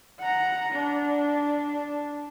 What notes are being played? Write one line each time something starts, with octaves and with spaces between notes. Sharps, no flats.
F#5 A#5
D4